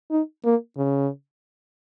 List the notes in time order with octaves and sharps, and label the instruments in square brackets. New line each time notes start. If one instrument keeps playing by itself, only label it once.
[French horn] D#4
A#3
C#3